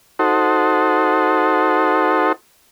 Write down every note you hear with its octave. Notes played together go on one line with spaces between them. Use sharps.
D#4 F#4 A4 C5